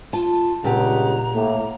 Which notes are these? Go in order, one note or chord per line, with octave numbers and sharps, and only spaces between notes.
F4 A5
C#2 G2 A#2 C#3 G4 F#5 A#5
A2 A#3